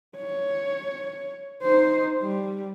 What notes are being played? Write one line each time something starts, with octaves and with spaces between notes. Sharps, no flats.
C#5
D#4 C5
G3